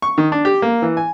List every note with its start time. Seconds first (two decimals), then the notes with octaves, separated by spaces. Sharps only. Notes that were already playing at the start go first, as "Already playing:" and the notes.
0.02 C#6
0.18 D#3
0.32 D4
0.45 G4
0.62 A#3
0.82 E3
0.97 G#5